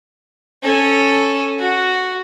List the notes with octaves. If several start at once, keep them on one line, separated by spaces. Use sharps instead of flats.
C#4 A4
F#4